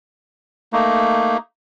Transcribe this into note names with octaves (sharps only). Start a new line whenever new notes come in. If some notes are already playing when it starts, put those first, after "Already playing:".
A3 A#3 D#4